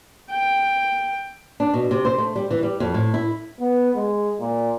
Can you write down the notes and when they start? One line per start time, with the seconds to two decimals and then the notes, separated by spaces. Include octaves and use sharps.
0.30 G5
1.60 D4
1.73 B2
1.91 C3
2.05 C5
2.18 A3
2.36 G3
2.51 E3
2.63 G3
2.80 F2
2.94 A2
3.14 E4
3.60 B3
3.96 G#3
4.40 A#2